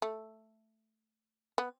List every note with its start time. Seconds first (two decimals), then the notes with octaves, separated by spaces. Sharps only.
0.02 A3
1.58 B3